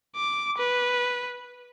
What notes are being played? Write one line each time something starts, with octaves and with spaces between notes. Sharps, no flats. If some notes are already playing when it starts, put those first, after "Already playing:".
D6
B4